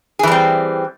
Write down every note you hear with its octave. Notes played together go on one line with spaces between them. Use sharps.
E3 G3 C4 G#4